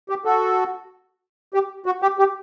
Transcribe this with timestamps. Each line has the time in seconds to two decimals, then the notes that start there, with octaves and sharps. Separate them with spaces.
0.09 G4
0.25 F#4 A4
1.54 G4
1.86 F#4
2.02 G4
2.19 G4